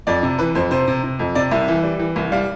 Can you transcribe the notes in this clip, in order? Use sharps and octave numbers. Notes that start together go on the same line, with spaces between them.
F2 D5
C3
E3 B4
F2 C5
C3 C5
C3
C3
F2
C3 D5
C2 E5
E3
G3
E3
C2
G3 F5